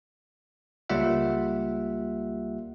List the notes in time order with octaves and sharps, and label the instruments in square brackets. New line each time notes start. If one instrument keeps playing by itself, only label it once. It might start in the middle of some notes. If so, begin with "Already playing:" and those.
[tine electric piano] C#2 G3 A#3 F4 E5 F#5